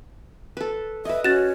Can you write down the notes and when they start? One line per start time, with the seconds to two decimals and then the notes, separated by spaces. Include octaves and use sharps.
0.57 A4 B4
1.05 B4 D#5 E5
1.24 C#4 F#4 A6 E7